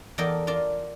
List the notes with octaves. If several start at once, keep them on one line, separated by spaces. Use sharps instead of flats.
E2 A4 A#4 D5 D#5 G5
F4 A#4 D5 A5